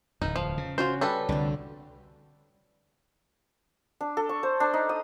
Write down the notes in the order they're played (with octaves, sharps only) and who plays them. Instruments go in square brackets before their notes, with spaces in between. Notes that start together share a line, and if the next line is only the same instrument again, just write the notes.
[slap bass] D1 E2 [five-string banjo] D#4 [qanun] B4
[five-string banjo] F3 [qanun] F5
[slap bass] C#3
[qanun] C#4 F#4 [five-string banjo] F4 C5
[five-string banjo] G3 A4 B4
[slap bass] C2 [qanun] D3 A3
[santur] D4
A4
C#6
C5
D4
D#4
D#6